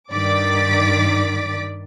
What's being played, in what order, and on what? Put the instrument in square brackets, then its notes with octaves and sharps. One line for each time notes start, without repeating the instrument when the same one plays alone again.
[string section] G2 D#3 D5 D6 A6 B6